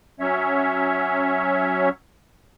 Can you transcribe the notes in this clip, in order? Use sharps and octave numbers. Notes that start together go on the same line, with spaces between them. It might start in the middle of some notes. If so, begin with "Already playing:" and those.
F#3 C#4 C#5 E5